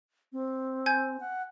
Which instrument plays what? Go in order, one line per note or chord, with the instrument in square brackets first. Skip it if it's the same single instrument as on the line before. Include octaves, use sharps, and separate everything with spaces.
[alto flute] C4
[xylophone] G#5 G6 G#6
[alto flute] F#5